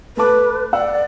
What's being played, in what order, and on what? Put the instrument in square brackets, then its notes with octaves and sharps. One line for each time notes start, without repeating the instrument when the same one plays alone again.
[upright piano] A3 A5 D6 [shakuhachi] B4
[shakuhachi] D5 [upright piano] F#5 E6